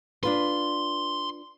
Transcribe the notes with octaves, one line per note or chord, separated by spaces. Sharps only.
D4 F4 B4 C6